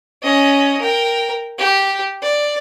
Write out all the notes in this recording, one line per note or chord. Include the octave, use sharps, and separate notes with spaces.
C#4 D#5
A#4 G5
G4
D5